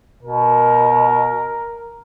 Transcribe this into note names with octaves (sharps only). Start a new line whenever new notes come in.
B2 A#4